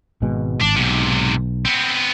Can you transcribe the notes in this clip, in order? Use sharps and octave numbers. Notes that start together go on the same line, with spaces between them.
G#1 B2 G#3
G#1 D4
B1 G#2 C3
B3 C4